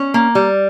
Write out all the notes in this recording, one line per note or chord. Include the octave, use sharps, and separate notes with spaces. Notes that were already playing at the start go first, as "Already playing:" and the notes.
Already playing: C#4
A#3
G3